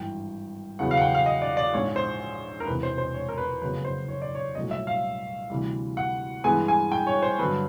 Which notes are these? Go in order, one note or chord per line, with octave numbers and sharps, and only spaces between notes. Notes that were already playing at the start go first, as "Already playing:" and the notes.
Already playing: G#1 G2 E3 G5
E2 C#3 F#3 B3 F#5
F5
F#5
G5
F5
D#5
D5
D5
A#1 G#2 F3 C#5
C5
A#4
E1 E2 C3 B4
C5
C5
C#5
A#4
B4
F#1 F2 C#3 F#3 A#3 B4
C5
C#5
D5
C#5
C2 A#2 F#3 A3 D#5
E5
F5
D2 C3 E3 G3
F#5
G2 E3 G#3 B3 G#5
G#5
G5
C#5
C5
G2 D3 F#3 B4